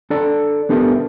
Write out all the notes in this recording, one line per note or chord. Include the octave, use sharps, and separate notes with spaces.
D4 A4 D5 A#5
B3 D4 G4 A4 A#4 E5